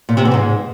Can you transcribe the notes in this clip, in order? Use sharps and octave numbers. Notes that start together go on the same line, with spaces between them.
A#2
C3
E2
G#2